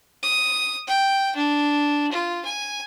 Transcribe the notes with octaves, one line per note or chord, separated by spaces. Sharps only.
D#6
G5
D4
F4
G#5